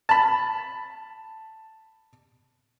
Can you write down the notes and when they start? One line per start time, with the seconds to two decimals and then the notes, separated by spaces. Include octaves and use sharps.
0.09 A5 B5